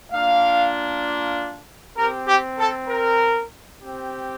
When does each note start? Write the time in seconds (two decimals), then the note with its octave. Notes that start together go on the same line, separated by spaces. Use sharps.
0.12 A#3 D4 F4 F5
1.96 C4 G4 A#4
2.27 G4
2.58 A4
2.89 A#4
3.81 C4 G4